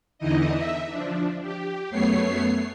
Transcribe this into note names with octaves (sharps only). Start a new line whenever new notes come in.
E2 D3 E3 D#4 E4 D#5
E5
F3 D4
G4
F#2 A3 B3 C#5 C7